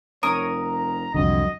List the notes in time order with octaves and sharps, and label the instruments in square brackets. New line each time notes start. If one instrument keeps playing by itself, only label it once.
[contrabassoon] F1 [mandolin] A#4 D#6 [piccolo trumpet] C#5
[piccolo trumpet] A#5
[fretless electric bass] C2 F2 D3 [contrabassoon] F#3 [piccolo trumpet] D#5